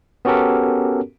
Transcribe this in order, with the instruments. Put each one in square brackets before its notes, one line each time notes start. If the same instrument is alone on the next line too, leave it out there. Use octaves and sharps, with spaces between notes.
[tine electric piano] B3 C#4 F#4 G4 A4 A#4